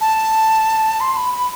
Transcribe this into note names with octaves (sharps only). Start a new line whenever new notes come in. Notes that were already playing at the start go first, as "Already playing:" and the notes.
A5
C6
B5
B5